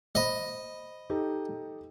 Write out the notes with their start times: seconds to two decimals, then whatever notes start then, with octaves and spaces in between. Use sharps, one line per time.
0.15 C5 D#5 B5
1.10 D#4 G4 A4